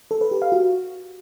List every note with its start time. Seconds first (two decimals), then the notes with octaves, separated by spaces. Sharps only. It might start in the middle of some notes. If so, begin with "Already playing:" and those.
0.11 A4
0.21 B4
0.31 G4
0.42 F5
0.52 F#4